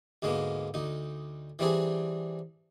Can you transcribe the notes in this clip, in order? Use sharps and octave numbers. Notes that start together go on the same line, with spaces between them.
D2 G#2 G#3 A#3 B3
D2 D#4
E3 G3 C4 D4 G#4